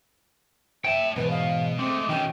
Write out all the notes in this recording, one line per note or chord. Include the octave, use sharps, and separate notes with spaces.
C#5 E5 G5 A5
E2 G#2 B2 B4
F5
G#3 A3 C4 D6
B2 D#3 E3 C#4 G5